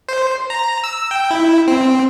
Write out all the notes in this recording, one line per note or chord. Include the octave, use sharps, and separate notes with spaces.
C5
A#5
E6
G5
E4
C4